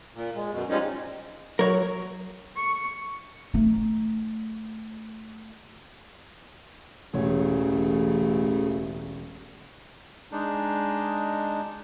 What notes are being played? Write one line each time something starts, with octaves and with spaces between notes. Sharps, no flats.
A#2
G#3
F#2 B2
F3 G3 G#3 C#4 D#4
F#3 A#4 C#5
C#6
A3 D#4
E1 A1 C#3 A3 C#5
G#3 D4 D#4